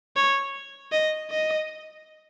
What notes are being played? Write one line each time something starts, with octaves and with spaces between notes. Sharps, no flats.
C#5
D#5
D#5